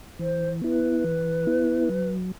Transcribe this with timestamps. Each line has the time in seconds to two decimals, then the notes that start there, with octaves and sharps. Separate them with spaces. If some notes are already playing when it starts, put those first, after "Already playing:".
0.19 E3 C5
0.62 B3 E4 B4
1.04 E3
1.46 B3 E4
1.89 F#3